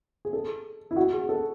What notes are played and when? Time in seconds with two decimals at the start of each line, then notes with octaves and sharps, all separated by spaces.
0.25 G#4
0.33 A4
0.91 E4
0.96 F#4
1.13 G#4
1.29 A4